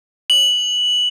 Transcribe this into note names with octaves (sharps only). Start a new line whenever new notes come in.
F#7